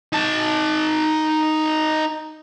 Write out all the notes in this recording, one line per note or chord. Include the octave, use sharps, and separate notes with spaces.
D#4 A5